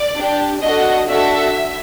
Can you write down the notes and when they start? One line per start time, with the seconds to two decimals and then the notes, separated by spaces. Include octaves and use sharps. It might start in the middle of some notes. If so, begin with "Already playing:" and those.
Already playing: D5
0.16 D4 G4
0.62 D4 F#4 A4 D#5
1.08 D4 F#4 A4 E5